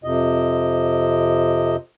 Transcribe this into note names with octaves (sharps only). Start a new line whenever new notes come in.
F2 C3 D#5